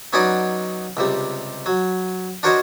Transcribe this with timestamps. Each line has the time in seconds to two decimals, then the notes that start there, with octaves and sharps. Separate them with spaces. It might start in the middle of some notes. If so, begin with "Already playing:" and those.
0.13 F#3 B3 C#4 D#4 D5 D#5
0.97 C#2 C3 G3
1.66 F#3
2.43 D4 F#4 A#4 C5 C#5 D#5